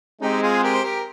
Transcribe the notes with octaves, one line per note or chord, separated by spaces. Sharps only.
G#3 C4 D#4 G4
F4 G#4
G4 A#4
C5
G4 A#4